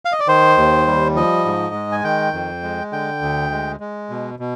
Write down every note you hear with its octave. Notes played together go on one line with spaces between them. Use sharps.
F5
D#5
D5
D#3 C5
D#2
G3
F3 D#5
G#2
G#3
G#5
D#3 G5
F2
G#3
D3 G5
D2
G#3
G#3
B2
B2